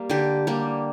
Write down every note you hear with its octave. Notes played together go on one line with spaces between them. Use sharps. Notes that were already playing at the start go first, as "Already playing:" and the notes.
Already playing: G3 A#3
D3 G4
G3 A#3